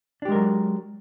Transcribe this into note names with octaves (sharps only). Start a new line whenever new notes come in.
F#3 G#3 D4 G4 A#4